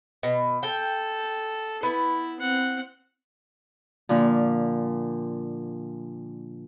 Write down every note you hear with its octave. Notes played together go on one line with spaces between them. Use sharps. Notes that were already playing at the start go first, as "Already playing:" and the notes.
B2
A4 G5
B3 E4
C4 F#5
A#2 D3 F3